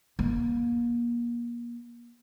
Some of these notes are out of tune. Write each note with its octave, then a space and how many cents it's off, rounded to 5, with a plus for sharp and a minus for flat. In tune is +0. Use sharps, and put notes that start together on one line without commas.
A#3 +30